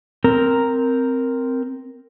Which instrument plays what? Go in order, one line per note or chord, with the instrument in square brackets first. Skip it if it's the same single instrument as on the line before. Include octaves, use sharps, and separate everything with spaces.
[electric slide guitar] C4 A#4